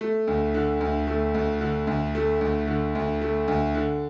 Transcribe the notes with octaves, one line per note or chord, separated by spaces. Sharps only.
A3
D2
D3
D2
A3
D2
D3
D2
A3
D2
D3
D2
A3
D2
D3